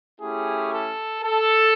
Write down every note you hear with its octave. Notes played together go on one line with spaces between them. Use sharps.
A3 C#4 E4 G4 G#4
A4
A4